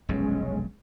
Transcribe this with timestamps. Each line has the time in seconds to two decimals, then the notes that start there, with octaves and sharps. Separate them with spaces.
0.09 F1 B1 G2 G#3 C#4